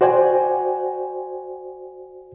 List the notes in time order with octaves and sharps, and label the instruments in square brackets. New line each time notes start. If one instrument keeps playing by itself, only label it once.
[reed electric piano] F#4 C5 D5 G5 G#5